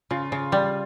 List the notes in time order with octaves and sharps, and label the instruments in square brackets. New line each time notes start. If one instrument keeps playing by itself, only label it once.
[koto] C#3 [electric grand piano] F4
[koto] C#3
G3